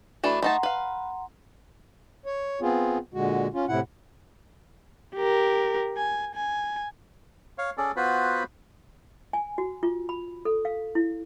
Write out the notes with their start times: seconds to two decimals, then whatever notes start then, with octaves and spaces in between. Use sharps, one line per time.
0.24 E3 A3 D4 F#4 B5
0.43 A3 D#4 F#5 A5 A#5 C6
0.63 B4 F5
2.26 C#5
2.61 B3 C4 F4 G#4
3.14 A#2 D3 G#3 F#4
3.54 C#4 F4
3.68 A2 C3 E4 F#5
5.15 G4 A#4
5.97 G#5
6.35 G#5
7.58 C#5 F5
7.78 C#4 G#4 A4 D5
7.96 B3 F4 F#4 B4 C5 B5
9.33 G#5
9.58 F#4
9.83 F4
10.09 B5
10.45 A4
10.65 F5
10.95 E4